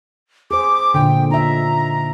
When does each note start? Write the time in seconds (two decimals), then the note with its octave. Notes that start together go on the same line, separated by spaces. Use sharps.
0.51 G#4 C5 D6
0.94 A#2 D3 G5
1.31 D#4 E5 A#5